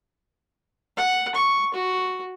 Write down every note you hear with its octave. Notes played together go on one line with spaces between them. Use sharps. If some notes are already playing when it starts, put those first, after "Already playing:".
F#5
C#6
F#4